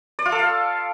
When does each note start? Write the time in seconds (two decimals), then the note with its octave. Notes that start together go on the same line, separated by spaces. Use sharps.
0.19 D5
0.25 F4
0.32 A4
0.39 F5